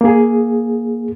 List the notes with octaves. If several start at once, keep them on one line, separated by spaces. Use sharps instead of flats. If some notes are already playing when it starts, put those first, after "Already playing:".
A#3 G#4